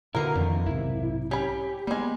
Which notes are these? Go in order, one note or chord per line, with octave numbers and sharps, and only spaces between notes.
A#2 D3 A#3 E4 F#4 A#4 B4
F2 D3 D#3
B1 G#2 C3 E4
C#4 G4 B5
G3 G#3 A#3 B3